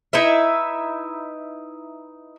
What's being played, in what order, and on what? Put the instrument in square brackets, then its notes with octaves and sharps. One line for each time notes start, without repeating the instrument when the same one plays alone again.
[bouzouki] D#4 E4 B4 E5